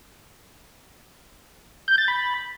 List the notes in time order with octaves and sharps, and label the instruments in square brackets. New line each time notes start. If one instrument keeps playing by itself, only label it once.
[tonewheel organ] G6
A6
B5